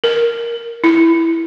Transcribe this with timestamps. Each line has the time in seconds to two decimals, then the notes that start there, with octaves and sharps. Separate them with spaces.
0.04 A#4
0.84 E4